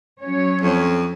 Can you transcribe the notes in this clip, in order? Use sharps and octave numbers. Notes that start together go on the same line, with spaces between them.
F#3 C#4 C#5
F2